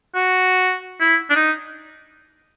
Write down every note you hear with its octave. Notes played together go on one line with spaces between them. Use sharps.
F#4
E4
D4
D#4